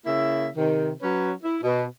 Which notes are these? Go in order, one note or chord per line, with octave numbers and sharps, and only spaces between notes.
C#3 A#3 E4 E5
C3 D#3
F#3 C#4 B4 C#5
E4
B2